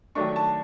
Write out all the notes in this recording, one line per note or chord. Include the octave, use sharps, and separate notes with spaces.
D#3 F#3 A3 D4 C#6
A5